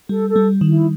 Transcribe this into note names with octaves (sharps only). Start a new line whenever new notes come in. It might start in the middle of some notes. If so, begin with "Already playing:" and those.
G3 A4
A4
G3
D#3
E4